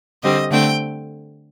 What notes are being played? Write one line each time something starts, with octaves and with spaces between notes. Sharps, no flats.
D3 G3 C4 D#5
D3 A3 C4 G5